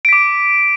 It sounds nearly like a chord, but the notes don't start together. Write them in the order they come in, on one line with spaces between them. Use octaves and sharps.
D7 B6 D6